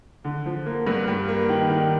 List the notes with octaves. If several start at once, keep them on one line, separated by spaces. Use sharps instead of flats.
D3
F3
A#3
G2
G3
A#3
D#3
D#3